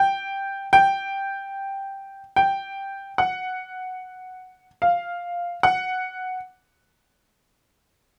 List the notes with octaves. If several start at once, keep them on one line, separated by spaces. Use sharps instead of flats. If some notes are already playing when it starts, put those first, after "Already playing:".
Already playing: G5
G5
G5
F#5
F5
F#5